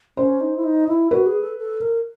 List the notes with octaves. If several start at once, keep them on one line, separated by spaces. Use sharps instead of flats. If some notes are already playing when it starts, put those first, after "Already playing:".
C#4 C5
D#4
E4
D#4
E4
F#4 B4
G#4
A4
A4
A#4